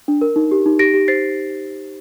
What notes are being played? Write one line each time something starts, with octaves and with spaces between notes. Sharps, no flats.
D4
A#4
D#4
G4
D#4
G4 A#6 D7
G4
C5 A6 C7